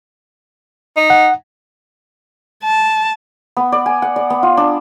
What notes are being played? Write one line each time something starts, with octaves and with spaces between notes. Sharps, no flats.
D#4
F#5
A5
B3
D5
G#5
F#5
D5
B3
F4
D4